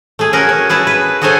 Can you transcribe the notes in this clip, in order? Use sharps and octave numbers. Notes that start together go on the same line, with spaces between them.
A3 G#4
C#4 F#4 G#4 A#4
C#5
E4 G#4 B4 A5
B4
F#4 G#4 A4 C5 C#5 G#5